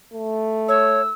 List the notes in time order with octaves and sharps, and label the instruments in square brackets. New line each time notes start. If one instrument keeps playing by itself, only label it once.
[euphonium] A3
[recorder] C#5 [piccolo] E6